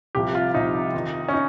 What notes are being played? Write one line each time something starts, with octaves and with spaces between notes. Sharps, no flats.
C2 C3 F3 G4
F4
C2 C3 F3 D#4
F2 D#3
C#4
D#4